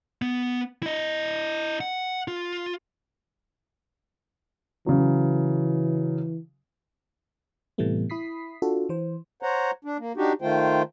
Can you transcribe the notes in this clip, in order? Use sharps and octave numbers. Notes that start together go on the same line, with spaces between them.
B3
E4 D#5
F#5
F4
C#3 E3 F#3
A2 C3 E3 G3 A3 B3
E4 B5 D#6 B6 C7
D4 F4 F#4 A4
E3 C5
C5 C#5 F#5 A#5
D4
A#3
D4 D#4 F#4 G4
D#3 A3 F4 C5 G5